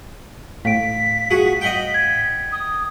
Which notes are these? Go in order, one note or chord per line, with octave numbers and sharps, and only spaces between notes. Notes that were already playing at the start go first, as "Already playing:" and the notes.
A2 F5 B6 D7
F#4 G#4
D#5 F#5 G5
G#6
D#6